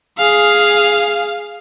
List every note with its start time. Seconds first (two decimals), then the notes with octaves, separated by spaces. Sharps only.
0.18 G#4 F5